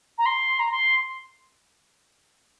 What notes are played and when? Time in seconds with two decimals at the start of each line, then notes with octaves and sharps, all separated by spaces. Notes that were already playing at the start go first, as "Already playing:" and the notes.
0.18 A#5
0.26 C6
0.59 A#5
0.71 C6